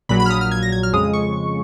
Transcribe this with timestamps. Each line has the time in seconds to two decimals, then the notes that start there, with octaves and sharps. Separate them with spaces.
0.09 A#1 A#2 F#3 B5
0.20 B5
0.26 F6
0.30 D#6
0.41 F6
0.51 G#6
0.62 A#6
0.72 G#6
0.83 F6
0.93 F2 C#3 G#3 D#6
1.13 C#6